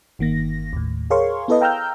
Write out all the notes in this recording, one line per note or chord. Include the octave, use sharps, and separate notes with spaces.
G1 D#3 A#3 A#6
D#2 A2
G#4 A#4 C#5 F5 C6 C#6
B3 E4 A4 B4 D#5
F5 G5 A#5 E6 F6 G6